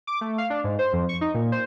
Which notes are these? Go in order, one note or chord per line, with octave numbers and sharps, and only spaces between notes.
D6
A3
F5
D4
G#2
C5
F2
C#6
D#4
A#2
C5